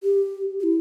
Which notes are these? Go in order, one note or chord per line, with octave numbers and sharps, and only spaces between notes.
G4
G4
E4